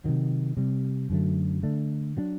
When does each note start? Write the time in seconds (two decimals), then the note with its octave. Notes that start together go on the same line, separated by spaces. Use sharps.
0.04 C3 D#3 F#3
0.57 C3 G3 C4
1.10 F#2 D3 F#3 A3
1.63 D3 A3 D4
2.17 F#3 A3 D4